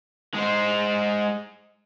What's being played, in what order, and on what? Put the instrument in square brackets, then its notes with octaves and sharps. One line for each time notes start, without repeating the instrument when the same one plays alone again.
[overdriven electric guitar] G#3 C5